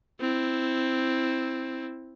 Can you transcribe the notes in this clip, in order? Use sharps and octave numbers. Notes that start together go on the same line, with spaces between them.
C4 E4